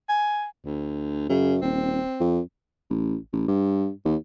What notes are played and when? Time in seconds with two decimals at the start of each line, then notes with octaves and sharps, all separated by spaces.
0.09 G#5
0.66 D2
1.29 F#2 C#3
1.62 D#1 C4
2.20 F2
2.90 A1
3.33 A1
3.48 G2
4.05 D#2